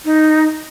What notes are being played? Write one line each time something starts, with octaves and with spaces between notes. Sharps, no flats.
D#4